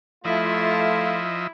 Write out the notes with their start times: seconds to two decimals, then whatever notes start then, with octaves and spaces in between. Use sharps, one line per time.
0.25 F3 A3 E4 F4 D#5 E5